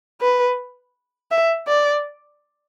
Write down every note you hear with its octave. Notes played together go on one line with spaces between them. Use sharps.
B4
E5
D5